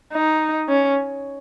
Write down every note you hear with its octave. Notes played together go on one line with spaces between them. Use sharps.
D#4
C#4